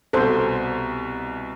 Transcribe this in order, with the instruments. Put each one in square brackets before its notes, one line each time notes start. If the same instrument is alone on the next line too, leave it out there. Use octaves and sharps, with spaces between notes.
[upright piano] C2 B2 [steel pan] A4 C5